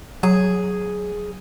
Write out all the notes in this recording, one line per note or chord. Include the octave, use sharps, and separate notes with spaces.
F#3 G#4